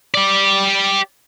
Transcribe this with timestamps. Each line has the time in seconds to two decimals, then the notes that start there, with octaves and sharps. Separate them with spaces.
0.14 G4 D5